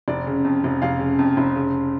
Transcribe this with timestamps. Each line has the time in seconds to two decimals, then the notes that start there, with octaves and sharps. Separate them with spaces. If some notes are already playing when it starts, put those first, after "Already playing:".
0.08 F1 D5
0.27 C#3
0.45 F2
0.64 F1
0.82 F1 F5
1.00 C#3
1.19 F2
1.37 F1
1.56 C#3